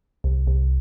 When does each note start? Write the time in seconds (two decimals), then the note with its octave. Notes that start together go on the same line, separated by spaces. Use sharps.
0.24 C2
0.47 C2